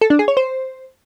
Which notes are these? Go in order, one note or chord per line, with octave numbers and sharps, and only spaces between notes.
A4
D4
G#4
C#5
C5